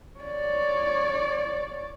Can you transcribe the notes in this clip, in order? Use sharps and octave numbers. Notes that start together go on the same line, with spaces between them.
C#5 D5